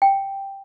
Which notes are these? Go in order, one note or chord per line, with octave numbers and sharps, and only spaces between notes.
G5